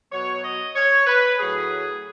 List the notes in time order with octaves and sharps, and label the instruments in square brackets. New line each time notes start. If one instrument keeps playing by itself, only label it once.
[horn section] B2 F#3 B3 C#5
D#5
C#5
B4
A2 F#3 C#4 G#4